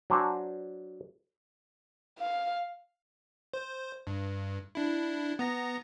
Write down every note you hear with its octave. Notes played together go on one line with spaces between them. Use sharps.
F#3 D4 C5 G#5 A#5
F5
C5
G2
D4 E4
B3 A#5 A#6